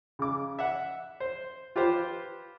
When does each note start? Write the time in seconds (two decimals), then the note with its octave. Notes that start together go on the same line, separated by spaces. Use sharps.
0.19 C#3 D6
0.59 E5 F#5
1.20 C5
1.76 F4 G4 B4 C5